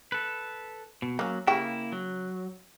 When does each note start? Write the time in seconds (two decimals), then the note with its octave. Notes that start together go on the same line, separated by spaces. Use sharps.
0.12 A4 B4
1.02 B2
1.19 F#3 A#3 C#4
1.47 C#3 A#3 E4 G4 G5
1.92 F#3